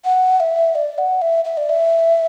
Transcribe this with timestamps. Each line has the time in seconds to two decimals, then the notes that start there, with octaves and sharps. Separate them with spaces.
0.05 F#5
0.40 E5
0.75 D5
0.98 F#5
1.22 E5
1.44 E5
1.57 D5
1.69 E5